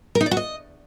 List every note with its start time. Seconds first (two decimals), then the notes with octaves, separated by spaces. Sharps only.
0.15 A#4
0.21 D#4
0.26 D5
0.31 F#4
0.37 D#5